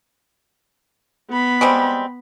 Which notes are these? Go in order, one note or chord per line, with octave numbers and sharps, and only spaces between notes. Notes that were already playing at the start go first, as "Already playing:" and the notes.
B3 B5
G3 G#3 C4